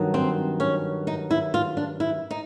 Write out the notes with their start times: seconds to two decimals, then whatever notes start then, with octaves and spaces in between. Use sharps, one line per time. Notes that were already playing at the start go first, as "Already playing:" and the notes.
Already playing: G2 D#3 F#3
0.14 C4
0.60 C#4
1.07 D#4
1.31 E4
1.54 F4
1.77 D4
2.00 E4
2.31 D#4